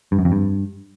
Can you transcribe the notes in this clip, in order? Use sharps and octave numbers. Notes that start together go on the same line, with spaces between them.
G2
F#2
F2
G2